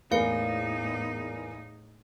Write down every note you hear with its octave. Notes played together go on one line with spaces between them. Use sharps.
E2 A2 A3 A#3 D#4 G#4 F5 C#7